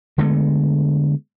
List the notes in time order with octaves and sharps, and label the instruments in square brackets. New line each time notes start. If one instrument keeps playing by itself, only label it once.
[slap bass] D3 G#3 A3 B3